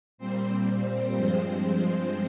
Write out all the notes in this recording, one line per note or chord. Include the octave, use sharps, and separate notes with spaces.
A#2 G3 C4 C5
G2 F3 G#3 C4 C5